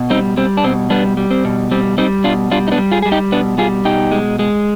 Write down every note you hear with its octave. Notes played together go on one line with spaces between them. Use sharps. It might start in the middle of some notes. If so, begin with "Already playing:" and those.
Already playing: B2
G3 C4 D#4
G3 C4
D4
B2 C4
G3 B3 D4
G3
C4
B2
G3 C4
G3 C4 D#4
B2 D4 F4
G3 D4 F4
D#4
B3 D4
G3
F4 G#4
G3 G#4
D#4 G4
B2 B3 D4
G3 F4 G#4
B2 D#4 G4
G#3
G#3